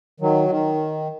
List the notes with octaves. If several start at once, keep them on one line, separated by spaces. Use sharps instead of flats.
D#3 F#3
D#3